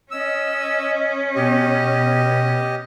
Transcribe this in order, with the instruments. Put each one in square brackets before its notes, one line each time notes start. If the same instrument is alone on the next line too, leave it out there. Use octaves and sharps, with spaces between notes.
[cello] C#4 [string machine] D#5 [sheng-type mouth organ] E6
[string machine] B2 [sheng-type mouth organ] G4 D#5